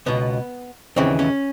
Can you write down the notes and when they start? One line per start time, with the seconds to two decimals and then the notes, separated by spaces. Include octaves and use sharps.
0.06 C#2 B2 B3
0.96 D#2 C#3 E3 C4
1.19 C#4